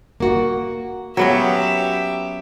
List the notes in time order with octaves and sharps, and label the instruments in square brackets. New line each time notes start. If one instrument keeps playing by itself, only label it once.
[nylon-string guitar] A#3 F#4
[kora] F#3 B3 C#4 [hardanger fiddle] G4 E5